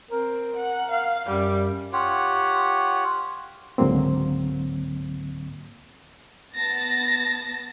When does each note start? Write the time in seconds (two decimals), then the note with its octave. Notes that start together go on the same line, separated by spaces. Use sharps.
0.11 C4 A#4
0.56 F#5
0.91 F5
1.27 F#2 G3
1.93 F4 G4 C#5 F#5
3.78 C#2 G#2 D3 F#3 A#3 C4
6.55 B3 A5 A6 A#6